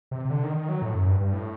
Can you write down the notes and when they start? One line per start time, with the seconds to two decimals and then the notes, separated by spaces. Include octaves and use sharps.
0.11 C3
0.25 C3
0.30 D3
0.43 D#3
0.56 D#3
0.69 F#3
0.82 A2
0.94 F#2
1.07 G2
1.21 G2
1.33 A2